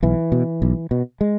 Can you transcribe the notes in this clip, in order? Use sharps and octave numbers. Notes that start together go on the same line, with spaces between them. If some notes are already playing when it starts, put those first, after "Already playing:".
B1 E3
B2
B1
B2
G#3